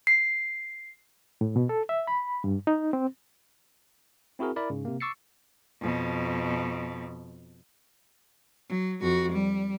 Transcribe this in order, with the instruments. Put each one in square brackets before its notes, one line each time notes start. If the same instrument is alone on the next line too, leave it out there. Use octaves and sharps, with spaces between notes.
[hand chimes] C7
[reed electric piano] A2
B2
A4
E5
B5
G2
D#4
C4
[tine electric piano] C4 E4 F#4 G#4 A#4
E4 A#4 D5 B5
G#2 C#3
C3 A#3
C#6 D6 E6 A6 C7 C#7
[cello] F2 B2
F#3
F2 F#4
G3